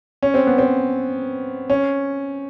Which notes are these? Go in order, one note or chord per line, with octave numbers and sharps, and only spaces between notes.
C#4
C4
B3
C4
C#4